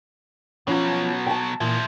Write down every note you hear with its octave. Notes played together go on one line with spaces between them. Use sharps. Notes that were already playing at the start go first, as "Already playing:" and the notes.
B2 F3 F#3 C#4
G5 A5
A#2 E3 F3 E4